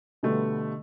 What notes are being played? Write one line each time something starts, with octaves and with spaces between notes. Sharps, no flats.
B2 D3 G3 A3 B3